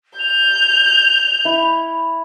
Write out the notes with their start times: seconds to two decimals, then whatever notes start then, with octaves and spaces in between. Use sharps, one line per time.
0.19 G6 F7
1.45 E4